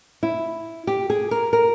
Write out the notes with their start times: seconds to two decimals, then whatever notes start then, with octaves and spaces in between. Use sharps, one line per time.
0.23 E4
0.87 G4
1.10 G#4
1.31 A#4
1.53 A#4